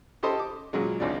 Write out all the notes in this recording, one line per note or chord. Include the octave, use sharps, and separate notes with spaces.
C#4 G4 A4 C5 D#5
D6
A#2 C#3 F#3 G#3
G#1 C#2 C#3 D4